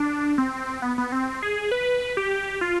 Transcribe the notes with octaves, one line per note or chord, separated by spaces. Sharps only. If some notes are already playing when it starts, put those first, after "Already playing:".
Already playing: D4
C4
B3
B3
C4
G#4
B4
G4
F4